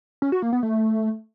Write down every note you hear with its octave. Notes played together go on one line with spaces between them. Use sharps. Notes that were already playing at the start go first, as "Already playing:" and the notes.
C#4
F#4
A#3
B3
A3